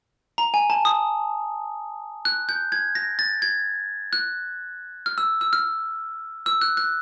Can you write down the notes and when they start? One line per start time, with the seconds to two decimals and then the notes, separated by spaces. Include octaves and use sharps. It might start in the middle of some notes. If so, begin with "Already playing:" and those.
0.38 A#5
0.54 G#5
0.70 A5
0.85 D#6
2.25 F#6
2.49 G6
2.72 G#6
2.95 A#6
3.19 A6
3.42 G#6
4.13 F#6
5.06 F6
5.18 E6
5.41 E6
5.53 F6
6.46 E6
6.62 F#6
6.77 F#6